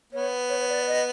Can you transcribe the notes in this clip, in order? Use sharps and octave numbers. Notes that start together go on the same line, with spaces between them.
B3 C#5
C#5
C#5
D5
D#5